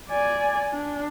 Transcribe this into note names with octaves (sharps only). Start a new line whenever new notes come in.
D5 G#5
D4